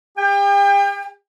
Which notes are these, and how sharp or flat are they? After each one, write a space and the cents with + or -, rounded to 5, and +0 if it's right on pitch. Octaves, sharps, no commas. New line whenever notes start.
G4 +45 G5 +35